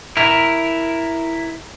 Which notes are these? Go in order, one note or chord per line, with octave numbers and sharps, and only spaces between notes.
E4 A#4